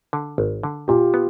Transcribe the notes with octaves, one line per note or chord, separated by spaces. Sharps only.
D3
G#1
D3
A#2 F4 G4
B3